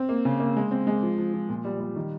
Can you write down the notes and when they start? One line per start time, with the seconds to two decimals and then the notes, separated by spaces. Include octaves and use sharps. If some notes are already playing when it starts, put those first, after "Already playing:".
Already playing: C4
0.09 A#3
0.25 C#3
0.40 A#3
0.56 G#3
0.71 C4
0.87 G#3
1.03 F3
1.18 F3
1.34 F3
1.49 A#2
1.65 G3
1.80 G3
1.96 D#3